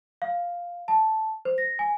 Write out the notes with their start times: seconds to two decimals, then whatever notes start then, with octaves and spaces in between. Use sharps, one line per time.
0.22 F5
0.88 A5
1.45 C5
1.58 A#6
1.79 G#5